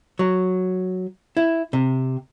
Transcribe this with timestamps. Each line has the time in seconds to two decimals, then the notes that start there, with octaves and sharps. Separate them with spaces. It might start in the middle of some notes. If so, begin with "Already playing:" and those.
0.19 F#3
1.37 E4
1.73 C3